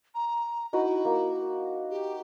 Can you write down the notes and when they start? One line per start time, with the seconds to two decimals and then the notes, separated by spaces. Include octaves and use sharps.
0.15 A#5
0.73 D#4 E4 F#4 B4
1.05 A#3
1.90 G4